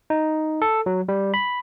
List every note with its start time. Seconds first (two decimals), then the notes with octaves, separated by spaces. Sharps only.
0.10 D#4
0.62 A4
0.86 F#3
1.09 G3
1.34 B5